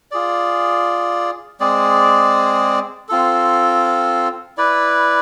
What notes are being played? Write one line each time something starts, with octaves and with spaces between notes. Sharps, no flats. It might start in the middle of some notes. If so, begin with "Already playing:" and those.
F4 G#4 D5
G#3 C4 G#4 D5
C4 F4 A4
E4 B4 D5